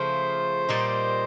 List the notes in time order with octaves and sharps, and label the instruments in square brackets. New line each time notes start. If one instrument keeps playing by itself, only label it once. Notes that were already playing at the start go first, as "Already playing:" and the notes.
Already playing: [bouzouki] C#3 F3 A3 [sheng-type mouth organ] C5
[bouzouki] A#2 G3 A#3 D#4